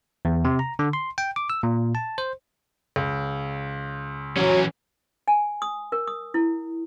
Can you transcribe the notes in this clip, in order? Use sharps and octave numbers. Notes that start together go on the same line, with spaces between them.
E2
C3
A#5
D3
C6
G5
D6
E6
A#2
A5
C5
C#2
E3 F#3 C#4
G#5
D#6
A#4
D#6
E4